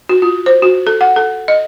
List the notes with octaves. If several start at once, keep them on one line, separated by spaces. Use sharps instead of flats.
F#4
F4
C5
F#4
A4
F#5
A4
D#5